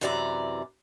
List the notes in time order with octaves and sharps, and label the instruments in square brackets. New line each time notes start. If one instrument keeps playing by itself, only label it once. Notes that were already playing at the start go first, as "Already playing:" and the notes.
[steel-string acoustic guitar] F#2 C3 E3 D5 G#5 A#5